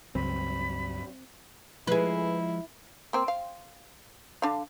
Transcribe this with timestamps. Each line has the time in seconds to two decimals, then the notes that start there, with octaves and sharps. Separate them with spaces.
0.15 C#2 G2 F#3 C4 B5
1.87 F3 G#3 E4 G#4 B4
3.13 A#3 C4
3.28 F5
4.42 D3 D4 F5